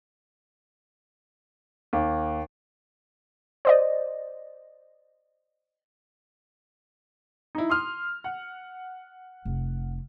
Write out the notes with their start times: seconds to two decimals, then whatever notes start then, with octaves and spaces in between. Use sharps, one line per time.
1.93 D#2
3.65 C5 D5 D#5
7.55 D#4 E4
7.70 C6 D#6 F6
8.24 F#5
9.45 F1